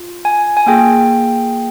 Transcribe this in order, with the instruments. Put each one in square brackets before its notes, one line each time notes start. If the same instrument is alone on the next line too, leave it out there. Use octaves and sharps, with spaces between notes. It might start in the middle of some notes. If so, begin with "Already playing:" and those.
Already playing: [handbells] F4
G#5
G#5
A#3 F4 G#4 G5